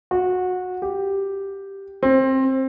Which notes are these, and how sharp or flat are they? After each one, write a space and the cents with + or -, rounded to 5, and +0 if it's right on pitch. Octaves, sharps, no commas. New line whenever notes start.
F#4 -20
G4 +0
C4 +20